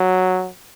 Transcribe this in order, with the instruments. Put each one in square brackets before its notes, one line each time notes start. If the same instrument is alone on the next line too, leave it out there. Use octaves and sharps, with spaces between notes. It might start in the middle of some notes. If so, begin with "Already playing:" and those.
Already playing: [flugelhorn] F#3